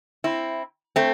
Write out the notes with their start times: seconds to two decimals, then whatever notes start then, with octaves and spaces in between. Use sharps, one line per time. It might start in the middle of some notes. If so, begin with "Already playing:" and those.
0.24 C4 E4
0.96 A3 C4